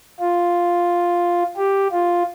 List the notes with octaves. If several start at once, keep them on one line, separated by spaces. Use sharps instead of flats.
F4
G4
F4